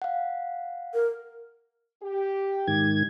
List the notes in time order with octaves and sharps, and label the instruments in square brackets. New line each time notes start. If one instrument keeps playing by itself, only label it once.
[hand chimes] F5 F#5
[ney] A#4
[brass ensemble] G4
[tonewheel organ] G#2 D#3 G#6